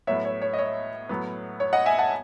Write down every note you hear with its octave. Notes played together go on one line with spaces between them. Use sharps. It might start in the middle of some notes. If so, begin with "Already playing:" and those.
A2 F#3 B3 C#5 E5
C#5
C#5
D#5
C#5
A2 F#3 B3
C#5
D#5 F#5
E5 G#5
F#5 A5